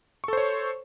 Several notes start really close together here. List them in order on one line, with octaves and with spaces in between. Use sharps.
C#6 A4 C5 C#5